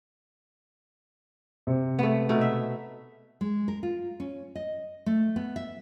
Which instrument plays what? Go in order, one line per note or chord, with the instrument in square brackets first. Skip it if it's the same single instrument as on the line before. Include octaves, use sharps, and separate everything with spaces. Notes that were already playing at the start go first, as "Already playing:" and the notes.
[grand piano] C3
[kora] A3 B3
B2 A3 D#4
E5
[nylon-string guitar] G#3
A#4
F4
C#4
D#5
A3
B3
E5